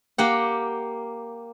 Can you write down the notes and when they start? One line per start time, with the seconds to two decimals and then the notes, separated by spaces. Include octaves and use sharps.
0.18 A#3 G4 F#5